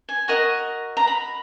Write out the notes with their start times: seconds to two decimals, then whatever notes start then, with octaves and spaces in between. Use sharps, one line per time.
0.09 G#5
0.28 F#4 A#4 D#5 C#6
0.97 A#5
1.07 B5